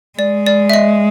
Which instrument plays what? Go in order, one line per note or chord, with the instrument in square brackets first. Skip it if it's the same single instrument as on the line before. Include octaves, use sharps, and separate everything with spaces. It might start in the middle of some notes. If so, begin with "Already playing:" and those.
[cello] G#3 [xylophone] D5
[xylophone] D5
E5
D#5